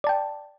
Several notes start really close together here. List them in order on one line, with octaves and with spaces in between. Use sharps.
D5 A5 G5